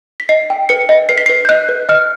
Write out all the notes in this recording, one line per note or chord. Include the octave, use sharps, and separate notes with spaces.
B6
D#5 C7
G5
B4 C#7
D#5
B4 C7
B6
B4 C7
G6
D#5 F#6
B4
D#5 F6